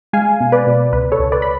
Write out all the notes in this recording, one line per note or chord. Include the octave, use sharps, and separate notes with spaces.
G#3 F5 G#5
B2
B4 D5
B2
C#2 B4
A4 C#5
C#2
B4 D5
B5